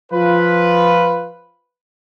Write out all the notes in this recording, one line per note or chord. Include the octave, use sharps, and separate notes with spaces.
F3 F4 B4